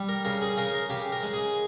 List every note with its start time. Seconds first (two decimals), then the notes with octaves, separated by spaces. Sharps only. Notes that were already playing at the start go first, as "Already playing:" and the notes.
Already playing: G3
0.09 A#4
0.25 C#3 A#4
0.42 G#4
0.57 C#3 A#4
0.74 A#4
0.90 C#3 G4
1.12 A#4
1.23 G#3
1.33 G#4